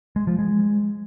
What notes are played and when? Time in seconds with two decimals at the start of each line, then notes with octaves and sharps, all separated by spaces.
0.16 G#3
0.27 F3
0.39 G#3